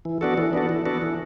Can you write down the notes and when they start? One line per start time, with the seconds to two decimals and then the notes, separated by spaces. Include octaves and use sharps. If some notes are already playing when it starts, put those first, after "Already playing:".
0.05 E3
0.21 B3 D4 F#4 A4
0.38 E3
0.53 B3 D4 F#4 A4
0.69 E3
0.86 B3 D4 F#4 A4
1.02 E3